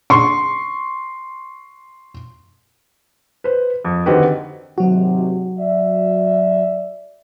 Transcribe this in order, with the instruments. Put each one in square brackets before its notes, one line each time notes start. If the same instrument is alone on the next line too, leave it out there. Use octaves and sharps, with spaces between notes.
[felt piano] C6 C#6
B4 C5
F2
D3 D#3 C4 F#4 G4 B4
[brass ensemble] G#1 C3 [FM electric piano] F#3 F#4
[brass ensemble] D5 E5